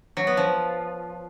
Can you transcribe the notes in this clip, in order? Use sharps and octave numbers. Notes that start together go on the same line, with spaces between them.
F#3
B3
F3